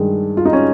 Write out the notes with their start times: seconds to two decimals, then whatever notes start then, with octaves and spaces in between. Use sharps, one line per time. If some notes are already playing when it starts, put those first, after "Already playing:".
Already playing: G2 D#3 G#3
0.37 F4
0.45 D#4
0.53 C#4